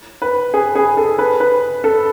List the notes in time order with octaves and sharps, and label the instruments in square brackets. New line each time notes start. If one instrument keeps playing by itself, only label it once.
[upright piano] B4
G#4
G#4
A4
B4
B4
A4